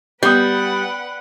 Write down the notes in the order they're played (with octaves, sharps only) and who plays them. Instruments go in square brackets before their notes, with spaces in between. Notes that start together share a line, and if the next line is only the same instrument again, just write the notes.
[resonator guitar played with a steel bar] G3 [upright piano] B3 D#6 [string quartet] B4 F#5 G5